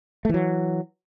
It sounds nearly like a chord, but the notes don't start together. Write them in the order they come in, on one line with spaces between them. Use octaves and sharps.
A3 E3 F#3